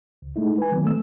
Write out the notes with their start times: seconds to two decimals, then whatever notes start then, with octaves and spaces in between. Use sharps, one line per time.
0.22 C#2
0.36 G#3 A3 D#4 E4
0.58 B4 G#5
0.72 D#3 F#3 B3 C4
0.85 A3 E6